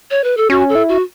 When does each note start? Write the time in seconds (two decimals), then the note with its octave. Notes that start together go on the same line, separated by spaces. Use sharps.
0.11 C#5
0.24 B4
0.37 A4
0.50 C#4 F#4
0.69 A4
0.75 E4
0.89 F#4